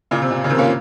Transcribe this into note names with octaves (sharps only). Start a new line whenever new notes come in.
A#2 C#3
C3
A#2
C#3
C3 D#3
A#3 C#4
F4